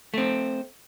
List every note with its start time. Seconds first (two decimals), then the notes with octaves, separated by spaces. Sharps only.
0.14 A3 C4